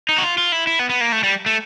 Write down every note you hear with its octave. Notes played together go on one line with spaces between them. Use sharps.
D#4
F#4
F4
F4
E4
E4
B3
B3
A#3
A3
G3
A3